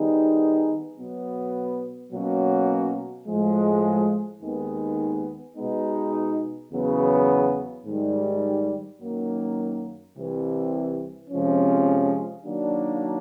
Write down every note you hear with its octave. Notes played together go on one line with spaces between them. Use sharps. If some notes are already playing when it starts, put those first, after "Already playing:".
Already playing: D#3 G3 B3 D#4 G#4
B2 F#3 B3
B2 F#3 A#3 C#4 F#4
A2 F3 G#3
D#2 D#3 G#3 B3
B2 G#3 B3 D#4
E2 C#3 F#3 B3
G#2 D#3 G3
F#2 D#3 F#3 A#3
C2 C3 E3
F2 C3 F3 G#3 C#4
D#3 F#3 A#3 D4